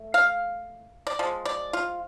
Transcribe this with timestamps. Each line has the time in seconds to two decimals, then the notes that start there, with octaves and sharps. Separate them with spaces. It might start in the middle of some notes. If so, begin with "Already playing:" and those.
Already playing: A3
0.14 F5
1.07 D5
1.19 F3 G#3
1.45 D5
1.73 F4